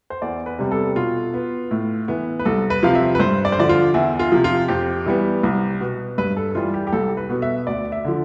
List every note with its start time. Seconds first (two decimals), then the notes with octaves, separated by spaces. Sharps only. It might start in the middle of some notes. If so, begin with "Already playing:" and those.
0.10 C5
0.22 E2 D5
0.46 B4
0.59 C3 G3 B3
0.71 A4
0.96 B2 F4
1.34 B3
1.71 A2
2.08 E3 B3
2.39 B4
2.45 C2 A4
2.70 B4
2.83 C3 F3 F5
2.95 E5
3.15 B4
3.20 G2 C5
3.45 D5
3.52 C5
3.57 D3 F3 D5
3.69 F4
3.94 E2 E4
4.19 F4
4.32 C3 F3
4.44 F4
4.68 F2 G4
5.06 E3 G3 B3
5.43 C2
5.80 B2 B3
6.18 G2 B4
6.37 A4
6.55 E3 G3 F4
6.74 G4
6.87 G4
6.93 C2 A4
7.17 B4
7.30 B2 B3
7.42 E5
7.67 D2 D5
7.92 E5
8.04 D3 F3